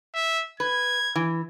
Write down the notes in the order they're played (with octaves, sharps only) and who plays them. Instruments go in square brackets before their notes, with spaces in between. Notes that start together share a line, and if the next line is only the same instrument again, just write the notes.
[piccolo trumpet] E5
[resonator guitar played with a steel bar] B4 [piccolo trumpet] G#6
[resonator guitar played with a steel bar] E3